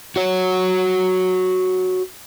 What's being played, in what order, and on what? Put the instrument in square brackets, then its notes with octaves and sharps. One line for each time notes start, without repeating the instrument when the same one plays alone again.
[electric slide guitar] F#4 C#5